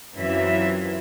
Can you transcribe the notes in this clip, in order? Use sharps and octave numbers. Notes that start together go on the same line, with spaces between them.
F#2 E3 C4 F4 E5